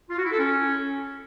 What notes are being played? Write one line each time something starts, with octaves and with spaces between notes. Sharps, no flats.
F4
F#4
E4
A4
C#4